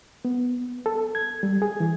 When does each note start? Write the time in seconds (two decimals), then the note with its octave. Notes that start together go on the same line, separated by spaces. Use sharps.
0.25 B3
0.86 A4
1.15 G#6
1.43 G3
1.62 G#4
1.80 E3